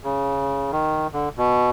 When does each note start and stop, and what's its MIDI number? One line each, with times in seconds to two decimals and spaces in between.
0.04 0.71 49
0.72 1.07 51
1.13 1.29 50
1.37 1.70 47